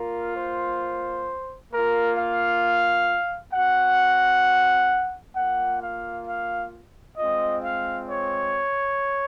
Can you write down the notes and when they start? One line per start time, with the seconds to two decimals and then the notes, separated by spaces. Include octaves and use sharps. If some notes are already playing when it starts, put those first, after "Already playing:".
Already playing: A#3 F4 A#4
0.35 C5
1.71 A#3 F4 A#4
2.17 F5
3.53 C4 F#4 F#5
5.35 A#3 F4 F#5
5.81 F5
6.26 F5
7.17 G#3 C4 F4 D#5
7.62 F5
8.08 C#5